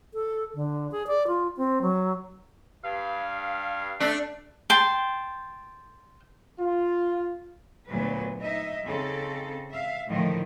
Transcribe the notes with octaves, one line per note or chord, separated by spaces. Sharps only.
A4
D3
G#4
D5
F4
C4
F#3
G2 F5
A3 D4
G5 A5 C6
F4
D2 A#2 F#3 B3 B4
D#4 D#5 E5
C#3 C4 D#4 A4
E5 F5
A2 D3 D#3 F3 A3